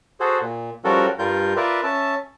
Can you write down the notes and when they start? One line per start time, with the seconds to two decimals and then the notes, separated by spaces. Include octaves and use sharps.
0.20 F#4 G#4 A4 C5
0.42 A#2
0.84 F3 G3 C#4 F#4 A4 A#4
1.19 G2 G3 F4 A#4 G6
1.56 F4 A#4 B4 D5 E5
1.83 C#4 E5 A5